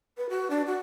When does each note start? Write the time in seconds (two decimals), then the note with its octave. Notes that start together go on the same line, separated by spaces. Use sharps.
0.17 B4
0.29 F#4
0.50 D4
0.67 F#4